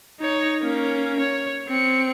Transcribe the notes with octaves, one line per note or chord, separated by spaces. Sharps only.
D#4 C#5
A#3 C#4
C#5
C4 C#7